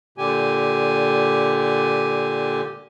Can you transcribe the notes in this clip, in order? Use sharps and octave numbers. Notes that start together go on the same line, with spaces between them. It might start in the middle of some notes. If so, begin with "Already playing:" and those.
A#2 D3 G4 G#5